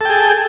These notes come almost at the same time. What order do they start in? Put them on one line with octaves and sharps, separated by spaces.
A4 G5 G#4